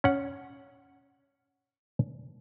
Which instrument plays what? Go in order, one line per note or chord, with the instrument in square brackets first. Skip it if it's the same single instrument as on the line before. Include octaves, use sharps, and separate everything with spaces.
[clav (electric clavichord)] C#4 F#5